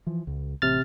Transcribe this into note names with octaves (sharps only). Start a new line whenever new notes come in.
E3 F3
C#2
A1 C3 F6 A6